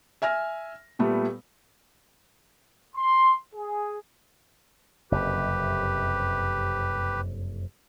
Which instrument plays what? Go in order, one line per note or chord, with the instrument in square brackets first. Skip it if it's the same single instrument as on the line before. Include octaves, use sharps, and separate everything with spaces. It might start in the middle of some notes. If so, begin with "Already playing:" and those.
[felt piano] E5 G#5 F6 A#6
A#2 G3 A3 B3
[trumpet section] C6
G#4
[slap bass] F#1 F2 C3 [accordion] G4 B4